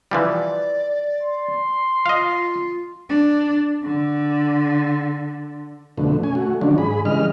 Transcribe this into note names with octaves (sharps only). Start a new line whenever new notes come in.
E3 F3 G3 D5
C6
F4 D#5 F5
D4
D3
F2 B2 D3 A3
C#4 G#5
A3 F#4
D3 D#3 F3 F#3 C#4 D4
G#2 G#4 B5
C#3 E3 G3 G#3 D#5 F6